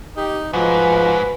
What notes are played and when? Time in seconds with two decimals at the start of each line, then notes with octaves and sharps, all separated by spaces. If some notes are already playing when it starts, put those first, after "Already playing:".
0.17 D#4 G4
0.53 G#2 F3 F#4 B4